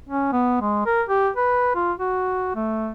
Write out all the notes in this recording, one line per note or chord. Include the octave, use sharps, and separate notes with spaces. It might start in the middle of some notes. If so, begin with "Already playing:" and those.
C#4
B3
G#3
A#4
G4
B4
F4
F#4
A3